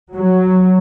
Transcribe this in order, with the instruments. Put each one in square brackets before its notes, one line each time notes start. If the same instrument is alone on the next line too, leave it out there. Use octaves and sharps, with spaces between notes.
[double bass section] F#3